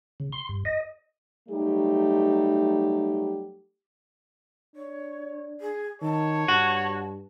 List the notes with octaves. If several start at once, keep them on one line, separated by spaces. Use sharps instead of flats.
C#3
C6
G2
D#5
F#3 G3 A3 D#4 G4
D4 C#5
G#4
D#3 C#5 A5
G2 F#4 A5